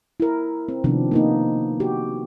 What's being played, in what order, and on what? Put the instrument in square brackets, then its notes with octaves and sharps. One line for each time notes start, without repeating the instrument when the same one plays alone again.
[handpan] E4 A#4
C4
C3 D#3 F3 B3 C4 D4
A#3 B3 D#4
F#4 G4